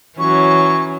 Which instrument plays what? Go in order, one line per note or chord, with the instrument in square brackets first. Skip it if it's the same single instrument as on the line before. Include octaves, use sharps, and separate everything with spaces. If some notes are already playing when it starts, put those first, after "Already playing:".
[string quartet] E3 F#3 C#4 [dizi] C#6